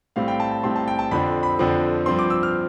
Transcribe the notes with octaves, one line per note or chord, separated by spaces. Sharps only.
A2 G3 C4 F5
G5
A5
A5
A2 G3 C4 C6
A5
G5
A5
F2 D3 F3 C4 B5
B5
F2 D3 F3 C4
G2 F3 C4 C6
D6
E6
F6